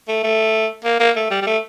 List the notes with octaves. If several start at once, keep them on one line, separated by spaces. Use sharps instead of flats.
A3
A3
A#3
A#3
A3
G3
G3
A3